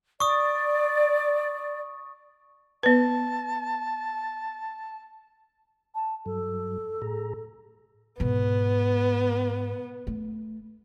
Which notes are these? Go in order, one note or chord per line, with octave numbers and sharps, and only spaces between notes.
D5 C#6 D#6
B3 B4 A5
A5
G2 F#3 A4
A2 G#4 A#5
G#2 B2 B3
A3